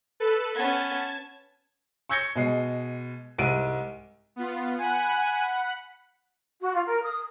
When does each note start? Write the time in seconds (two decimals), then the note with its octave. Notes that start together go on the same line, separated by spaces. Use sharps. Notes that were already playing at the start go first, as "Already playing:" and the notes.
0.20 A4 B4
0.55 B3 C#4 A5 G#6
2.09 C#6 E6 G6 G#6 A#6 C#7
2.35 B2 G#3 D#5 C7
3.38 C2 G#2 D7 D#7
4.36 B3 F4
4.79 F#5 G#5 B5 F#6
6.61 F#4
6.74 F4
6.85 A#4
7.03 D#6